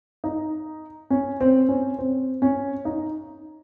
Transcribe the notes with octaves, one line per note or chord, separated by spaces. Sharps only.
D#4
C#4
C4
C#4
C4
C#4
D#4